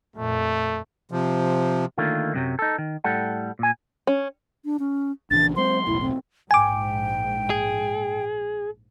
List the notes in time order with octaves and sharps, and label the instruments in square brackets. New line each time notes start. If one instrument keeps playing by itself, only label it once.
[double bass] F2 A#2 [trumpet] A3
[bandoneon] C3 F3
[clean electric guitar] D3 D#3 A3 A#3 F4
F#2 C3 F#3
D#4 A4
D#3
A2 G3 A4 F#5
A#2 G#5
[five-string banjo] C#4
[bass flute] D4
C#4
[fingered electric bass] A#1 C#3 E3 [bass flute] D4 [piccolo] A6
[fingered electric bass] F#3 G#3 C4 [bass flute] C5 [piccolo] C6
[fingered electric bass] E1 B1 A2 [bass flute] E4
[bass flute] C4
[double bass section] A#1 G#2 [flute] G5 [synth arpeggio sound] G#5 D6
[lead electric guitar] G#4